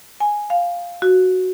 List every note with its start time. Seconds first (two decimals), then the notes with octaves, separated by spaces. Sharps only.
0.20 G#5
0.50 F5
1.02 F#4